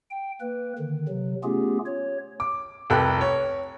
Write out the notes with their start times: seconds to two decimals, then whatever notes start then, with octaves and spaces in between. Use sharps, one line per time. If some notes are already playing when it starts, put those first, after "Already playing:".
0.11 G5
0.41 A#3 B4
0.79 D3 D#3
1.08 C3 F#3
1.44 A3 B3 C#4 F4 G4 G#4
1.86 C#5
2.40 D6
2.90 F1 C2 A4 G5 B5 F#6
3.21 C#5